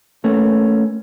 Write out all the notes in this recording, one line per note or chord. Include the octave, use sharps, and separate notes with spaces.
A3 A#3 C#4